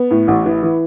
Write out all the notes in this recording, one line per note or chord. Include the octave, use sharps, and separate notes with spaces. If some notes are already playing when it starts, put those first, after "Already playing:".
Already playing: B3
A2
A1
E3
E3